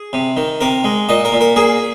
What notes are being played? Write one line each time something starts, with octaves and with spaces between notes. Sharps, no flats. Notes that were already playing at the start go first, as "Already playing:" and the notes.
Already playing: G#4
C3
D#3
C3 A#4
G#3
A#2 D#5
A#4
A#2
A#4
A#3 G#4